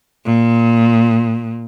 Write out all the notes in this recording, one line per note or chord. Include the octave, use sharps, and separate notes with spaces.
A#2